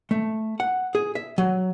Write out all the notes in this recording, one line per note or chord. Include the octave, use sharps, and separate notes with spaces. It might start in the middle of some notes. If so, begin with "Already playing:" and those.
A3
F#5
G#4
E5
F#3